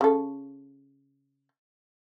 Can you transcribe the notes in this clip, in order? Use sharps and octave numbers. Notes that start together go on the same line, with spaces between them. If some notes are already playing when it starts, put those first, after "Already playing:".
C#3 A4